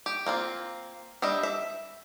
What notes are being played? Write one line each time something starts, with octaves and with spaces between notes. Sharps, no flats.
G4
A#3 C4 F4
G3 D4 D#5 E5
E5